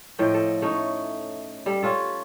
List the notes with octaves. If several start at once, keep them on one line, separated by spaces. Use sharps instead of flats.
A2 F3 D#5 G5
A4
A3 C#4 D#4
G3 A4
C#4 F4 A4